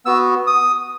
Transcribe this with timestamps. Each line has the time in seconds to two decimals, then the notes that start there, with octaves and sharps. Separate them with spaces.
0.06 B3 F#4 E6
0.47 D#6